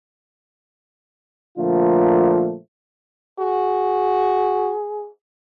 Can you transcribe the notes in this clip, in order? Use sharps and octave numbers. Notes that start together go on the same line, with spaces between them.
A#2 D3 F3 A3 A#3 F4
F#4 G#4